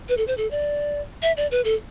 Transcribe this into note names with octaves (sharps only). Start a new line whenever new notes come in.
B4
A4
C5
A4
D5
E5
D5
B4
A4